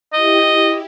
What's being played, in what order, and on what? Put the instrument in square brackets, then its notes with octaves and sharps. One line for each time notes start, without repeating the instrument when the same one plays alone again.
[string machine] E4 G4 [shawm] D#5